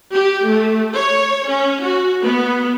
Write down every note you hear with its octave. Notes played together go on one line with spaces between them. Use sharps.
G4
A3
C#5
C#4
F#4
B3